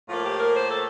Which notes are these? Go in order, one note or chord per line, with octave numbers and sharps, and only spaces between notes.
A2 F3 A#3 F4
G4
A#4
C5
A4